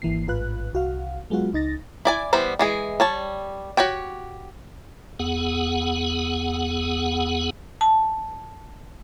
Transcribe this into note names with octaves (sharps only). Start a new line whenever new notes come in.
G#1 E3 A#3 C7
A1 G#2 F4 B4 F#6
C2 F#4 F5
F#3 G#3 B3 F4 F#4
C#2 D#4 A6 A#6
E4 D5 G#5
E3 G3 B3 C5
E3 G#3 G#4
G3 C#5 A5
F#4 G4 C#5 G5
E2 B3 G#4 F#5
A5